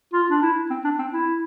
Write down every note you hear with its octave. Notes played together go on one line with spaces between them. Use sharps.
F4
D4
E4
C4
D4
C4
E4